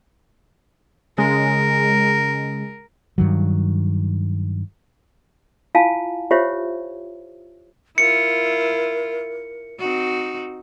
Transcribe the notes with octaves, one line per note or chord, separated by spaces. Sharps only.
C#3 G#3 A#4
G2 D#3 F#3
E4 F4 F5 G#5 A5
F4 G4 C5 C#5 E5
E4 F4 A#4 C#7
C4 D#4 F#4